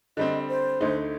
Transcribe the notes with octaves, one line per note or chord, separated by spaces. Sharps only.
D3 G3 C4 D#5
C5
D2 D3 A3 D#4